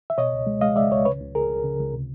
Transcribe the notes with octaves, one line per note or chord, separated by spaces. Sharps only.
E5
B2 C#5 D#5
C#2
G#3
G#3 D#5 F5
G#3 D5 E5
C#2 C#5 D#5
C#3 B4 C#5
C#2
C#2 G#4 A#4
C#2
C#3
C#2
C3